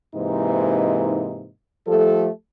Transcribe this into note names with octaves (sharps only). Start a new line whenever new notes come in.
G#2 C3 E3 A#3 D#4
F3 G3 A3 G4 A4